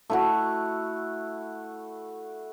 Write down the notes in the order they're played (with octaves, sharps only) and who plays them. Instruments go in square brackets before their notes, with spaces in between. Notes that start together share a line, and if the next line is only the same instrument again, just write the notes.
[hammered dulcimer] A3 E4 F#4